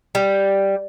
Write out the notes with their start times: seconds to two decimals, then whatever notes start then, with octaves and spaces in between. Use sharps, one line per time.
0.15 G3